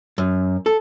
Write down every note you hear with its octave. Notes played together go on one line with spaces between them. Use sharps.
F#2
A4